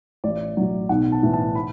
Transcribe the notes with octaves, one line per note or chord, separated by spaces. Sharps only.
A1 D5
A2 F#3
B1 F#5
A5
A2 E3
A5
B5